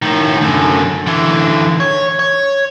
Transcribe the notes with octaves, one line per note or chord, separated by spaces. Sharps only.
A2 D#3
F#2 D3
D3 E3
C#5
C#5